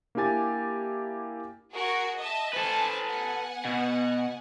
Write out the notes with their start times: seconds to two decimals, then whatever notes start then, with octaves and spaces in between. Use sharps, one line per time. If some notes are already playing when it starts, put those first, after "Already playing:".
0.15 A#3 D4 E4 G4 G#5 A6
1.73 F#4 G#4 A#4
2.17 D#5 E5 A5
2.53 A4 B4 C5 G#5 A5
3.05 B3 F#5 G#5
3.65 B2